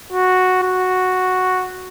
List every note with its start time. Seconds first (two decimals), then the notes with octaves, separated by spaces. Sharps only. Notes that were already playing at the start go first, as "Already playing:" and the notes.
0.13 F#4
0.64 F#4